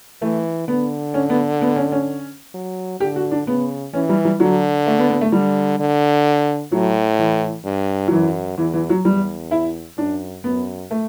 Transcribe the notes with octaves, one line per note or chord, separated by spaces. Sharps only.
E3 A3
D3 B3
C#4
B3
B3
C#4
C#4
F#3
D3 G4
F#4
D4
C#3 B3
E3 C#4
G3
G3
D3 F#3
A3
B3
B3
A3
D3 G3
D3
A2 F#3
E3
G2
F#3
F#2 E3
E2 E3
E3
F#3
E2 G3
E4
F#2 D4
F#2 B3
A3